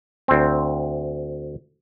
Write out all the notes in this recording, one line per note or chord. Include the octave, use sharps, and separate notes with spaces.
D2 C4